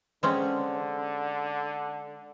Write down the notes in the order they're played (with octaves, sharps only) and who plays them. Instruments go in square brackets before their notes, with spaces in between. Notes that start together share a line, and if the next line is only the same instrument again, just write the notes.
[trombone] D3 [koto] G#3 C4 C#4